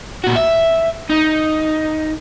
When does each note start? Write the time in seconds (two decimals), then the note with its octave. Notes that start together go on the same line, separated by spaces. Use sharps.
0.24 A#2 F#4
0.36 E5
1.10 D#4